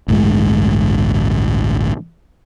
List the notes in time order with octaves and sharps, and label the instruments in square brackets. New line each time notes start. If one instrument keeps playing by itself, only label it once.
[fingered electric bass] A1 D2 G2 G#3